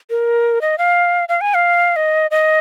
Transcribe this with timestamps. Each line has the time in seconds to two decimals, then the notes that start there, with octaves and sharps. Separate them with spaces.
0.10 A#4
0.62 D#5
0.78 F5
1.29 F5
1.41 G#5
1.54 F5
1.96 D#5
2.31 D#5